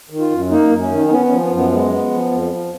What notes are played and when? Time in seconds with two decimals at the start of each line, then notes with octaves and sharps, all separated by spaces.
0.10 D#3
0.19 F4
0.30 F#2
0.50 A#3 D#4
0.70 F#2
0.81 C#4
0.90 D#3
1.05 D#4
1.11 B3 C#4
1.26 C#4
1.31 F3
1.41 B3
1.51 F#2
1.56 B3
1.71 G#3 B3
1.91 B3
2.11 F3
2.31 F2
2.51 F3